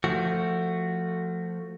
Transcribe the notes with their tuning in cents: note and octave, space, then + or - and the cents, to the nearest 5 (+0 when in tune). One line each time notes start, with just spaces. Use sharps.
F3 +0 A3 +15 F#4 +0